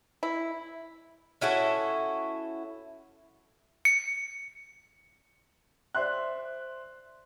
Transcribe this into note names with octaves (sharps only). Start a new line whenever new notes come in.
E4
C#4 E4 F#4 A4
C#7
C5 D5 E5 C6 F#6